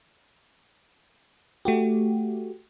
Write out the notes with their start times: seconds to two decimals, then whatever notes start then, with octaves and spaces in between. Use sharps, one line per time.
1.65 A3 F#4 G4